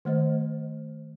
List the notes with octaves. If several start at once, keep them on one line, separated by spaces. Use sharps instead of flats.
D#3 A3 C5 D#5